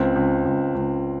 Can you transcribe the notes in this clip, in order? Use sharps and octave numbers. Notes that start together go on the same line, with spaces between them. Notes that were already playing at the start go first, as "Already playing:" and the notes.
Already playing: C#2 C4
C#2
C#2
C#2